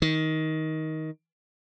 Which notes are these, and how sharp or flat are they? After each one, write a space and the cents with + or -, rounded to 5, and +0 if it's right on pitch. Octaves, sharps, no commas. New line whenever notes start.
D#3 +15